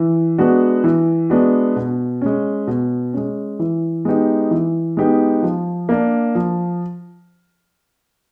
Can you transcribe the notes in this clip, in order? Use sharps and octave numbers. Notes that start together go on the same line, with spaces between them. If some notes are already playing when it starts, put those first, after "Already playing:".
Already playing: E3
G#3 B3 D4 F#4
E3
G#3 B3 D4 F#4
B2
G#3 C#4
B2
G#3 C#4
E3
G#3 B3 D#4 G4
E3
G#3 B3 D#4 G4
F3
A#3 D4
F3